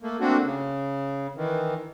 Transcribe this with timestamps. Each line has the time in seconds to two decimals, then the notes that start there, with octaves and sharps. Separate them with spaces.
0.02 A3 A#3
0.21 A3 A#3 C4 D4 F#4
0.44 C#3
1.36 D#3 E3